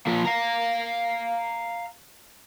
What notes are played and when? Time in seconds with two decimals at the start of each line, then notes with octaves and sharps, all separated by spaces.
0.07 F3 A#3
0.25 F5 A#5